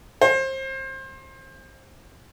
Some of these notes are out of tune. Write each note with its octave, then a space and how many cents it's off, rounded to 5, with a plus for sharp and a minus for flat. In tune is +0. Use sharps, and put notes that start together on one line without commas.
C5 +30